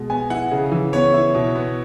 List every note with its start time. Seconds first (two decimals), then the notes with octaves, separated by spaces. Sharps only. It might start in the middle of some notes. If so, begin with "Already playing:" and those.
Already playing: B2 G#3
0.10 B3 G#5
0.30 E4 F#5
0.51 C#3
0.72 E3
0.93 B3 C#5
1.14 E4
1.35 B2
1.56 B3